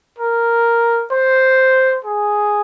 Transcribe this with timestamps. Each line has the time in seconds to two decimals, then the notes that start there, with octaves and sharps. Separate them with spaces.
0.19 A#4
1.11 C5
2.05 G#4